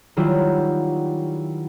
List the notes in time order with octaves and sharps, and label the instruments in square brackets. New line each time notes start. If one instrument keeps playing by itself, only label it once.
[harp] D#3 F#3 G3 E4 F4